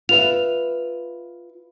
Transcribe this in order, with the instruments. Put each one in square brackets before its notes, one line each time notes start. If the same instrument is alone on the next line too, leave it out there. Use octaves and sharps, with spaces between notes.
[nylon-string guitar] F4 B4 E5 [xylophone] F7